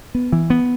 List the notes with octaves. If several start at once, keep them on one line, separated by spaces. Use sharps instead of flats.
B3
E3
B3